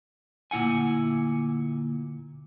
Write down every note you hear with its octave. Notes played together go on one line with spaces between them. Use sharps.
D2 A#2 E4 F#5 G#5